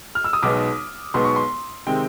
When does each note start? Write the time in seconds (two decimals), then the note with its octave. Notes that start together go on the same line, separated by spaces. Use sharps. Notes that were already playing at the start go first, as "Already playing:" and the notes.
0.15 F6
0.24 E6
0.33 D#6
0.43 B1 B2 G#3 B3 D#4 D6
1.14 B1 B2 G#3 B3 D#4 C6
1.24 C#6
1.36 C6
1.87 C3 D#3 G#3 C4 G5